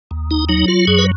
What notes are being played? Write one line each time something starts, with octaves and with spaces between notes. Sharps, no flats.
D#2
D#4
F#3 D#4
F4
F#2 G#4
B4